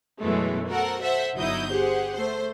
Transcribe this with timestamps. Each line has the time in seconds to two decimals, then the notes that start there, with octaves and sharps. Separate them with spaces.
0.20 F#2 B2 E3 F#3 G#3 A3
0.67 F#4 A4 A#4 C5 F#5
1.01 A4 C5 E5 F#5
1.36 G1 F#3 D#4 E4 D#6 G6
1.69 G4 G#4 C5 F#5
2.14 A3 C5